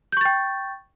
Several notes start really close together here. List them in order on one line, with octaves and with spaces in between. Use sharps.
G6 C#6 A6 G5